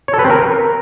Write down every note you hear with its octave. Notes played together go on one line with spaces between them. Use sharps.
C#5
A4
B4
C4
A#4